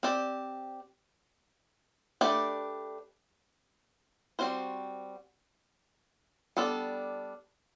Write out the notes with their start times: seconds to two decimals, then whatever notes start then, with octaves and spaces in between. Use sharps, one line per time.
0.03 C4 G4 D5
2.21 A3 D4 G4 B4 D5
4.39 G3 C4 F#4 C5
6.57 G3 B3 D4 A4 D5